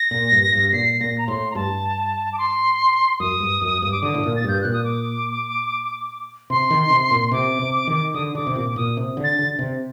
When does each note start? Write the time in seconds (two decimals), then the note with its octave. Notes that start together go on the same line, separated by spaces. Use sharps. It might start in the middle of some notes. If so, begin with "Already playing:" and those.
Already playing: A#6
0.11 A#2
0.32 G2
0.53 G2
0.73 A#2 C7
1.00 A#2 A#6
1.18 A#5
1.27 A2 C6
1.51 A#5
1.55 G2 A5
2.33 D6
2.38 C6
3.20 F#2 D#6
3.40 G2
3.62 F#2
3.82 G2
3.92 D6
4.02 D3 D#6
4.14 A2
4.23 A#2
4.36 A6
4.44 G2 G6
4.61 A#2 F#6
4.73 D#6
4.84 D6
6.50 C3 C6
6.70 D#3
6.90 C3
7.11 A#2
7.32 C3 D6
7.59 C3
7.87 D#3
8.14 D3 D#6
8.35 D3 D6
8.47 C3
8.55 A#2 D6
8.70 D6
8.76 A#2 D#6
8.97 C3
9.17 D3
9.24 A6
9.39 D3
9.59 C3